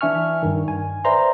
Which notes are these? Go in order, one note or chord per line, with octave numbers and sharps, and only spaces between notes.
E3 D4 E5 G#5 C#6 F6
G2 D#3
G#5
B4 C5 D5 E5 A#5 C6